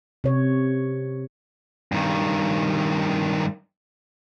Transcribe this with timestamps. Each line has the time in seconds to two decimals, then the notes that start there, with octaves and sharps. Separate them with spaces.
0.24 C3 C#5
1.92 G2 D#3